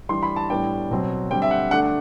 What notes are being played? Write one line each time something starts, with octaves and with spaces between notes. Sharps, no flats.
E3 G3 D4 C6
B5
A5
A2 G3 B3 D4 G5
B2 F#3 C4
D3 G3 C4 G5
E5
F#5
D3 A3 D4 F#5